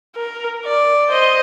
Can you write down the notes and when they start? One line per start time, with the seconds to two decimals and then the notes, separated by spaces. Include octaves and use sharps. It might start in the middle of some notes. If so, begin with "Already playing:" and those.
0.16 A#4
0.65 D5
1.10 C5 D#5